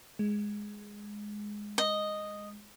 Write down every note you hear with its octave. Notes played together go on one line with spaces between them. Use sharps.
G#3
D#5